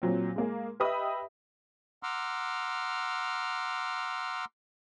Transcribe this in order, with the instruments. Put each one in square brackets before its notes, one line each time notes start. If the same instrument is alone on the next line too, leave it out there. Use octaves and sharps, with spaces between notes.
[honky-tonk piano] A#2 F#3 C4
G#3 A#3 G#4
G4 B4 D#5 E5 B5 D#6
[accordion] F#5 A#5 C6 D6 E6 F6